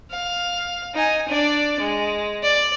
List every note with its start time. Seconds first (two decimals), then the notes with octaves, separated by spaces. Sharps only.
0.11 F5
0.94 D#4 G#5
1.28 D4 D5
1.79 G#3
2.43 D5